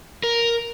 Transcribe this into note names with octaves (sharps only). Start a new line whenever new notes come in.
A#4